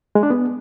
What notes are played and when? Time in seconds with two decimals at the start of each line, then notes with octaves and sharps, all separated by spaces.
0.15 G#3
0.23 D4
0.30 B3